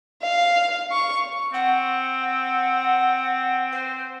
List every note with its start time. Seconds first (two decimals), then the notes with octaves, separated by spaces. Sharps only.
0.23 F5
0.92 C#6
1.53 C4 F#5
3.71 C5